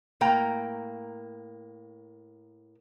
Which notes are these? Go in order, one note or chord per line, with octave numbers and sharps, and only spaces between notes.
A2 A#3 G5 A#5